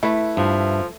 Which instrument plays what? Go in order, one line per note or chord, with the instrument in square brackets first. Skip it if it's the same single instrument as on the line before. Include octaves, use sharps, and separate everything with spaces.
[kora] A3 B4 [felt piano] E4
[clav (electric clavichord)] G2 [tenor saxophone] F3